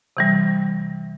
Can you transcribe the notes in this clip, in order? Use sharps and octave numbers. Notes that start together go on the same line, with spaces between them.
C3 E3 G3